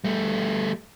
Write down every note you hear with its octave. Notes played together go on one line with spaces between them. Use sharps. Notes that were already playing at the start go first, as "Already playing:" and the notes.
G3 A3